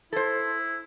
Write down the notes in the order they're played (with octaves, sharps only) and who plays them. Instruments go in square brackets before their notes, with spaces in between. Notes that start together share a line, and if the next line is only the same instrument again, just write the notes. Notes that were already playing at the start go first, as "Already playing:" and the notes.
[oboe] E4 [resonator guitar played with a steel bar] A4 C5